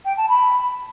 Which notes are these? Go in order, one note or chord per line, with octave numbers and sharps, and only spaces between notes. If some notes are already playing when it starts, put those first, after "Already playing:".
G5
A5
B5